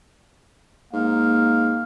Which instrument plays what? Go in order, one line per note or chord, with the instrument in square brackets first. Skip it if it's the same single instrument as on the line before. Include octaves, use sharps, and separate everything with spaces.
[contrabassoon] G#2 [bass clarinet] A#3 [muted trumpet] F5